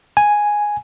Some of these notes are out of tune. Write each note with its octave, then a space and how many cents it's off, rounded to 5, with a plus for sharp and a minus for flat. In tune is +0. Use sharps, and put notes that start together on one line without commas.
G#5 +0